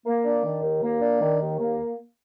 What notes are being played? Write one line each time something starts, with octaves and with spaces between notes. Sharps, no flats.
A#3
D4
D#3
D#2
A#3
D4
D#3
D#2
A#3